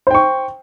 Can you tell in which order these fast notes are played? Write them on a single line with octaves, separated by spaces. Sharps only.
C5 G5 C#6